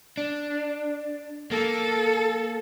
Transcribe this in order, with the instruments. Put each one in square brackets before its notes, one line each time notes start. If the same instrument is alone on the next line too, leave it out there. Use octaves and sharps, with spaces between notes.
[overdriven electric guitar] D4
[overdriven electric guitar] A#3 [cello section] A4